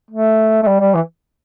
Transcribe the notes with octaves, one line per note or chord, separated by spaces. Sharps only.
A3
A3
G3
G3
E3